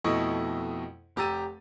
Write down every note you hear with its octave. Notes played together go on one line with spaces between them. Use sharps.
F2 B2 A3 E4 D#5 C#6
F1 G4 A#5 E6 A6 D#7